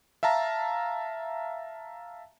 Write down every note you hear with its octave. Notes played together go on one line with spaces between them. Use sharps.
E5 F5 A5 A#5